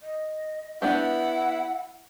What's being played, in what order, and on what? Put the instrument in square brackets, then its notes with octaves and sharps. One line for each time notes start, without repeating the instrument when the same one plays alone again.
[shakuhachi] D#5
[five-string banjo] B3 D4 G4 [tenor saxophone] E4 [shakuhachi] F#5